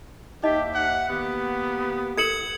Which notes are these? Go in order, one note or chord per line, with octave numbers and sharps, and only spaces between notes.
D#2 D#4 G4 D#5 E5
F#5
D#3 A#3 B3 G4
A4 A#4 G#6 C#7 F#7